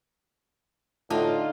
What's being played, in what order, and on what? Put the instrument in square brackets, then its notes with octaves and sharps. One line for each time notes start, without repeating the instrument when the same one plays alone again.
[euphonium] A2 [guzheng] D3 D4 D#4 [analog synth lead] F4